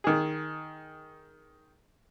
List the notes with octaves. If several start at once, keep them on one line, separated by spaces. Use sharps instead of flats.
D#3 G#4